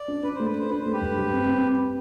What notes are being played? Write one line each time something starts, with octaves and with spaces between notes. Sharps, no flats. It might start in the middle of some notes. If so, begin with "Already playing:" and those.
Already playing: D5
D4
D4 B4
A3 C5
B4
D4 C5
D4 B4
A3 C5
G4 B4
G2
G3
C4
C4